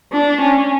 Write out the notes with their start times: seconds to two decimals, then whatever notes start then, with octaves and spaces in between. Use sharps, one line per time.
0.13 D4
0.41 C#4